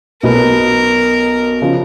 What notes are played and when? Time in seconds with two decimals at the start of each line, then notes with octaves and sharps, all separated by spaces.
0.23 B1 B2 F#3 B3 A#4
1.62 C#3 F3